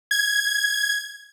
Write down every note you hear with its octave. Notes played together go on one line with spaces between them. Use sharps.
G#6